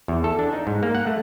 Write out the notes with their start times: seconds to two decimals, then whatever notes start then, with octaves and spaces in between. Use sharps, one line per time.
0.08 E2
0.24 A4
0.39 D4
0.53 D#4
0.67 G#2
0.83 A#3
0.95 F#5
1.07 A3